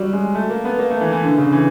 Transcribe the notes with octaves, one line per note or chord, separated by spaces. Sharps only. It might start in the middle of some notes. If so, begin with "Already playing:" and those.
Already playing: F#3 G3
G#3
A3
A#3
B3
A#3
A3
E3
E3
D3
C#3
E3